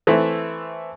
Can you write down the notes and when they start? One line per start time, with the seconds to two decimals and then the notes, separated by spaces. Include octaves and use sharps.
0.07 E3 A3 C4 E4